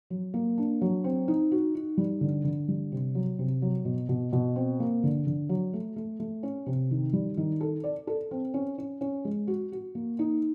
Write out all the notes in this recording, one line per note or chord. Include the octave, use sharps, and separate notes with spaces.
F#3
A#3
D4
F#3
C4
D#4
F#4
D#4
G3
D3
D3
G3
C3
F#3
C3
F#3
B2
B2
B2
C4
A#3
D3
D3
F#3
A3
A3
A3
C#4
C3
D#3
G3
D#3
A4
D5
A4
C4
C#4
C#4
C#4
G#3
F#4
F#4
A#3
D#4